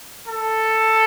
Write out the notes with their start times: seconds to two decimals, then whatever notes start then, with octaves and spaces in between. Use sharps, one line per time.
0.27 A4